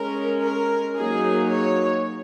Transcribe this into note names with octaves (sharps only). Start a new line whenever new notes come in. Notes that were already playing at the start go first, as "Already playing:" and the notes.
Already playing: G#3 C#4 A#4
A#4
F#3 A#3 D#4 G#4
C#5